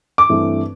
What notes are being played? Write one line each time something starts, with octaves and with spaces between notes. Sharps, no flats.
D6
G2 E3 A3 C4